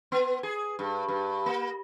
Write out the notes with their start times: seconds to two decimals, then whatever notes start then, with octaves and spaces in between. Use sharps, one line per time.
0.12 B3
0.43 G#4
0.79 G2
1.09 G2
1.46 A#3